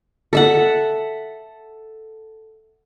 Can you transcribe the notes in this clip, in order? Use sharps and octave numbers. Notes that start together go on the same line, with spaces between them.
A4 E5 F#5